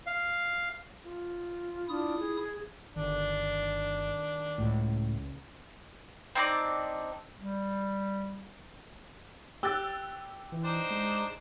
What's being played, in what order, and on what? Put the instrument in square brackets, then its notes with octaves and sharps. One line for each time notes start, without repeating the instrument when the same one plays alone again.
[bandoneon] F5
[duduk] F4
[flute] D4 [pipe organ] E4 D#6
[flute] G#4
[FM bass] G1 [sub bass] D#3 [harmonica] D4
[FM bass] C#2 [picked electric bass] A2
[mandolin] C4 D4 D#4 D5
[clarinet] G3
[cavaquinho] G4 [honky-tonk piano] E6 F#6 A6
[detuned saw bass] E3
[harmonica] D4 D#4 C5
[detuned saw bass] G#3